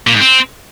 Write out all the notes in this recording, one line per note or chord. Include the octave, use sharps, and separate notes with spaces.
A#2
G#2
C4